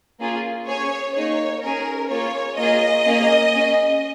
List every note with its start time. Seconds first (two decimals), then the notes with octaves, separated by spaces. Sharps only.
0.20 A#3 C#4 F4 G#4
0.67 C#4 G#4 C#5
1.15 A#3 D#4 G#4 C#5
1.62 C#4 G#4 A#4
2.10 A#3 F4 G#4 C#5
2.57 A#3 F4 G#4 D#5
3.05 A#3 C#4 G#4
3.53 C#4 G#4